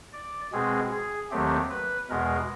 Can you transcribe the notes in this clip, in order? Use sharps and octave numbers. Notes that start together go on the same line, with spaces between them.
D5
B2 G#3 C4 G#4
G#4
D#2 D#3 F#3 A3 C4 G4
B4
E2 B2 G#3 B3 A#4